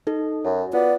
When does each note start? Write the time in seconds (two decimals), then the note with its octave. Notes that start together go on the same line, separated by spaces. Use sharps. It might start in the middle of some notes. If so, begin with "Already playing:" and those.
0.07 D#4 A4
0.45 F#2 F#4
0.73 B3 F4 D5